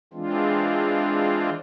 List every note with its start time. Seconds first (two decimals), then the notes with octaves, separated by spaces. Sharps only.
0.13 E3 G#3 C4 D4 F4